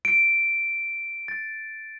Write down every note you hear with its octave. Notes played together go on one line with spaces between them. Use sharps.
D7
A6